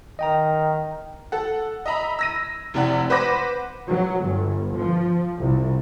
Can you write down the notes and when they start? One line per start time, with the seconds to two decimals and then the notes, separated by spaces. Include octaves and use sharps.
0.19 D#3 D#5 G5 A#5
1.32 A4 F#5
1.86 D#5 E5 A#5 B5
2.19 E6 A#6 D#7
2.74 F1 C3 E4 D5 F#5
3.10 B4 C5 F#5 B5 D6 A#6
3.88 F#3
4.23 G1
4.77 F3
5.39 C2